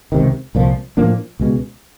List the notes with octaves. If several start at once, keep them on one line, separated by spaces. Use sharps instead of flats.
C#2 C3 D#3
C2 A#2 F3
A2 F3 A#3 D4
C#2 B2 G#3